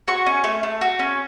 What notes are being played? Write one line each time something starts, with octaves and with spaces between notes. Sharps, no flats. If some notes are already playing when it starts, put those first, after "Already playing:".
F#4 C#6
C#4
A3
A3
F#4
C#4